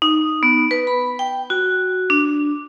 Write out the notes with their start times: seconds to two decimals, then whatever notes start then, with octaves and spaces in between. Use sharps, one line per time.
0.02 D#4
0.43 B3
0.71 B4
0.87 B5
1.19 G5
1.50 F#4
2.10 D4